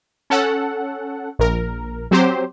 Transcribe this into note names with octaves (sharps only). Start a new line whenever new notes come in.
C#4 A4 F#5
A#1 A#4
F#3 C4 G4 C5